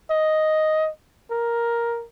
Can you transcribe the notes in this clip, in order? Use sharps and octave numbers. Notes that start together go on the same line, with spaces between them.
D#5
A#4